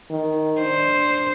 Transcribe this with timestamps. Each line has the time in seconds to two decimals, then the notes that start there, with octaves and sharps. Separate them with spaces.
0.10 D#3
0.62 D4 C5